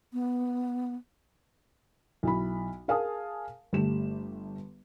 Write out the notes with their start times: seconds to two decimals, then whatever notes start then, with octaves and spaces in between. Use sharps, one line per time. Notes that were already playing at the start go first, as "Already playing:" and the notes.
0.13 B3
2.23 B1 E4 B5
2.88 G#4 A#4 F5 G#5 A5 D#6
3.73 G1 A3 G4 E7